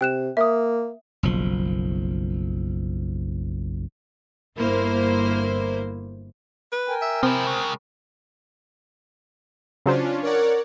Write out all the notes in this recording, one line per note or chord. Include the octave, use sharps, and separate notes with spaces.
C3 G5 F#6 E7
A#3 E5 D#6
F#1 B1 F3
G1 A#3 E4 C5
B4
A#4 G5 G#5
E5
C3 F3 C4 E4
C#3 G#3
C#3 F#3 C#4 D4 F4 C5
A#4 C#5 D5 F#5